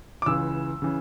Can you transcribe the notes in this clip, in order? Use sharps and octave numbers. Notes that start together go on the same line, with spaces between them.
D6
C#2 C#3 E3 E6
C#3 E3